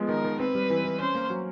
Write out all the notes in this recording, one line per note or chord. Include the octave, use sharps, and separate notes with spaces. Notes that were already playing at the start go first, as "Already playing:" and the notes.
Already playing: F3 G#3 B3
D#3 A#4
D#3
C4 B4
G3
E3
E3
C#4 C5
A#3
F#3